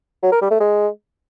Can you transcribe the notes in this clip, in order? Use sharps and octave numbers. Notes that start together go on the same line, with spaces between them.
F#3
A#4
G3
A3
G#3